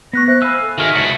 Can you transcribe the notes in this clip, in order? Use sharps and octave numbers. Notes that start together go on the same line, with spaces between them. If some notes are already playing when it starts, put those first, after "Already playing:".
B3 C#6 F#6 A#6 B6
C5 E5 F#6
F5 G#5 B5 E6 F6
A4
D#3 G#3 F#4 E5 G#5 F6
C#2 E4 F#4 A5 C#6 A6